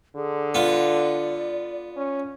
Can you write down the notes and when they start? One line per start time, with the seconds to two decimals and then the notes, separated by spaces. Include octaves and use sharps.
0.16 D3 G#4
0.54 B3 F4 D5
1.96 C#4